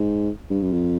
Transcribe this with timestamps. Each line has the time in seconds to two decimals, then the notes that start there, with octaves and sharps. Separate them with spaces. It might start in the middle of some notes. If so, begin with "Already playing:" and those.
Already playing: G#2
0.50 G2
0.61 F#2
0.72 F2